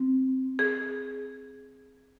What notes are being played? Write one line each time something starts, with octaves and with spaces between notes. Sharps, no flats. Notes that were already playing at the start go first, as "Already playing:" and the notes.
Already playing: C4
G#4